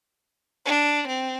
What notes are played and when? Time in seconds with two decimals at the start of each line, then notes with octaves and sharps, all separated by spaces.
0.66 D4
1.08 C4